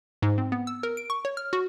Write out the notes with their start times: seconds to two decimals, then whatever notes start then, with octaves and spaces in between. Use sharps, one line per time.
0.22 G#2
0.38 C4
0.52 B3
0.67 E6
0.83 A#4
0.97 D7
1.10 C#6
1.25 C#5
1.37 F6
1.53 F#4